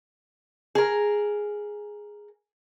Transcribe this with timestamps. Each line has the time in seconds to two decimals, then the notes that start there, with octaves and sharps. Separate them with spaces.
0.75 G#4 A#4